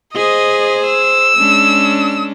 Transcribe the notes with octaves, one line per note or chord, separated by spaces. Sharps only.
G#4 C5 D#5
E6
G#3 C#4 D4